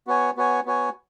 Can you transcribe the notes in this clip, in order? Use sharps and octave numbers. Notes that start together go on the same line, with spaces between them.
B3 F#4 C#5 G#5
B3 F#4 C#5 G#5
B3 F#4 C#5 G#5